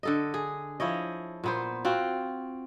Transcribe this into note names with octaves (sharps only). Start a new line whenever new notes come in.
D3 A4 D#5
G#4
F3 E4 C#5 D#5
A#2 B3 C5
C4 F4 F#4